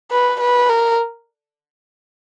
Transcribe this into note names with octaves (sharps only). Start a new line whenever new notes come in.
B4
B4
A#4